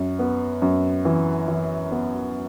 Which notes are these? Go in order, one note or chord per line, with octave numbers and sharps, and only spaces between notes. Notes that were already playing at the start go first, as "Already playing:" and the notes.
Already playing: F#2
B3
F#2
E3
E3
B3